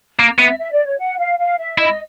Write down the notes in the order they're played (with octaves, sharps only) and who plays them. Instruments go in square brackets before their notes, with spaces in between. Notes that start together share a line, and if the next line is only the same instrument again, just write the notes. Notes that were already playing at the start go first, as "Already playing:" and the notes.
[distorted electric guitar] A#3
[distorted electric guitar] B3 [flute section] E5
[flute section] E5
D5
C#5
F#5
F5
F5
E5
[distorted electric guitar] E4 [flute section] D#5